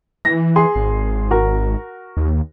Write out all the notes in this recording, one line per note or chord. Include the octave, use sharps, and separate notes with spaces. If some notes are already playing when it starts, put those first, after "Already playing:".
E3 A#6
G#4 C6
G#1
F#4 A#4
D#2